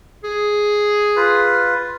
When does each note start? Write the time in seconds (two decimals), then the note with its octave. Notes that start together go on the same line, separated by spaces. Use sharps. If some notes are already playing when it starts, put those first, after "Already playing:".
0.24 G#4
1.16 F4 B4